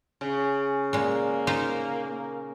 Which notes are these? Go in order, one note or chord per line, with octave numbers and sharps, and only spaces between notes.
C#3
A#2 G#3 A#3
D#4 F4 C5
A#3